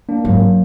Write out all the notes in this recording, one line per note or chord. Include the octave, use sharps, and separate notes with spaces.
A#3 D4
G#2 F#3 A#3